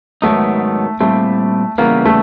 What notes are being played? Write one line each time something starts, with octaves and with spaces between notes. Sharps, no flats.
G#2 D#3 F#3 A3 B3 D#4
A#2 G3 A3 C4 E4
C#3 E3 G3 A#3 B3
A3